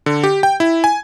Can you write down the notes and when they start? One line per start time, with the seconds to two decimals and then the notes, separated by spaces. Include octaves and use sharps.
0.06 D3
0.24 G4
0.43 G5
0.60 E4
0.84 G#5